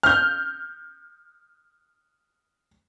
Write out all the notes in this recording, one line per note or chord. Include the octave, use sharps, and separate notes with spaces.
F6 G6